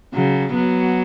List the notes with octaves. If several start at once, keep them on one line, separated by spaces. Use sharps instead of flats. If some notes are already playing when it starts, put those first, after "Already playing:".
C#3 F#3
F#3 B3